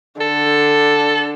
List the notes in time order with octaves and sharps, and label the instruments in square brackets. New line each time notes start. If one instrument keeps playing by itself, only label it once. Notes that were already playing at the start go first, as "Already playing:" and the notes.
[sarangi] D3 [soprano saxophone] A4